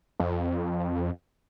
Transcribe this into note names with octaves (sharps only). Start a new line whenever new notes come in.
F2